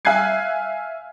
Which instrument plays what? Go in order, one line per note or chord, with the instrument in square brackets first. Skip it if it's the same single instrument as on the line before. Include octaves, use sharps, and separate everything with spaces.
[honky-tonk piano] E5 F5 G#5 F#6 G#6 C7